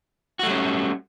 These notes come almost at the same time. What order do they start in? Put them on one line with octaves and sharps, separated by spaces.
F#4 A3 G3 C#4